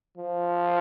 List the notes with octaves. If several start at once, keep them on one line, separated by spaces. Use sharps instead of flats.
F3